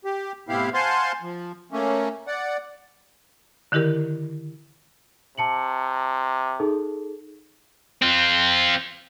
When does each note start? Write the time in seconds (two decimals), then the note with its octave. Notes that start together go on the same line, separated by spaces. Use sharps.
0.05 G4
0.49 A2 C3 B3 E4 G4 F5
0.74 C5 F5 F#5 G#5 A5 C6
1.22 F3
1.72 A3 A#3 C#4
2.27 D5 F#5
3.72 D3 D#3 E4 G4 A#4
5.38 C3 A5 C#7 F#7
6.60 D#4 G#4 A4
8.02 C4 F4